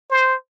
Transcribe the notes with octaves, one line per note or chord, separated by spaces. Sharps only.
C5